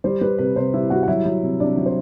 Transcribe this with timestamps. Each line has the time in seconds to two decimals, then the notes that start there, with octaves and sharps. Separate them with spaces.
0.04 G3 C5
0.21 G3 B4
0.39 C3 B4
0.56 C3 C5
0.74 G3 E4 E5
0.90 G3 F#4 F#5
1.03 F#5
1.08 F#3 E4 E5
1.25 F#3
1.43 C3
1.60 C3 D4 D5
1.77 F#3
1.86 C5